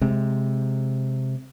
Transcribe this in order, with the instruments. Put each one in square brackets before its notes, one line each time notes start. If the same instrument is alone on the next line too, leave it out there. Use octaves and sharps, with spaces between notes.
[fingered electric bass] C3 G#3